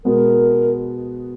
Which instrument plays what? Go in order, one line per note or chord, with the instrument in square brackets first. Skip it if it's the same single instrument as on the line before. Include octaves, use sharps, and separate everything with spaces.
[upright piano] B2 G#3 B3 [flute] A#4